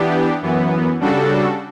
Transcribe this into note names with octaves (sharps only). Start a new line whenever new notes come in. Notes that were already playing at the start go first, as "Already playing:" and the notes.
Already playing: E3 B3 D4 G4
F#2 E3 B3
C#3 G3 D4 F#4 A4